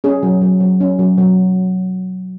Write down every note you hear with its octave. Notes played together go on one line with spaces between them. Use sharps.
C#4 G#4
F#3
F#3
F#3
C#4
F#3
F#3